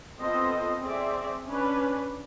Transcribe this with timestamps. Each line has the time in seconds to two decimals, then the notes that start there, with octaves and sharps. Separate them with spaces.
0.19 B3 C4 F4 A4 C5 D#5
0.81 C4 G#4 D5 E5
1.47 C#4 D4 B4